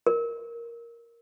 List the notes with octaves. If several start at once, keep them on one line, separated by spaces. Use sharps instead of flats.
A#4